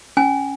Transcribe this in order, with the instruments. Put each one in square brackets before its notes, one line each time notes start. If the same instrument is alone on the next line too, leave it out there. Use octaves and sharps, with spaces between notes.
[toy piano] C#4 G#5